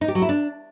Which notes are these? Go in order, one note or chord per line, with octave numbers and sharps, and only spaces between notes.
D#4
G4
F#3
E4
D4